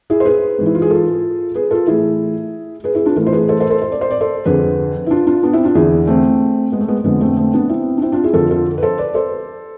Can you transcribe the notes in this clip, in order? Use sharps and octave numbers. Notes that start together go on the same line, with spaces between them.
E4 G#4
C5
G#4 B4
G#2 E3
E4
F4
G#4
F4 A4
G#4 B4
F4 A4
A2 E3 E4 G#4
G#4 B4
E4 G#4
D4 F4
A2 E3 F4 A4
C5
G#4 B4
A4 C5
A4 C5
A4 C5
C5
D5
C5
D5
A4 C5
F2 D3 G#4 B4
E4
D4 F4
D4 F4
B3 D4
C4 E4
D4 F4
E2 D3 E4 G#4
A3 C4
G#3 B3
A3
G#3 B3
F2 D3 G#3 B3
A3 C4
A3 C4
B3 D4
C4 E4
D4
C4 E4
D4 F4
E4 G#4
F2 D3 F4 A4
F4 A4
B4
A4 C5
B4 D5
A4 C5